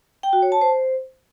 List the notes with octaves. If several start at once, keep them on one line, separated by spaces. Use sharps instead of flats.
G5
F#4
C#5
A5
C5